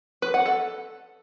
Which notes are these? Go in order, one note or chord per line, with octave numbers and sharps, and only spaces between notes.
B4
F#5
A4